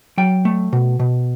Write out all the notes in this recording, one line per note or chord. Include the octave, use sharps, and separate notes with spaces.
F#3 G5
A3
B2
B2